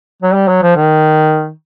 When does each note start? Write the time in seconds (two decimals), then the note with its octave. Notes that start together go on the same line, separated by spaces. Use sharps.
0.23 F#3
0.34 G3
0.48 F#3
0.63 F3
0.76 D#3